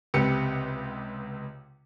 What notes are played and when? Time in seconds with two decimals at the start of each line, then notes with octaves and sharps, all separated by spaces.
0.14 C#2 C3 G4 B4 C#7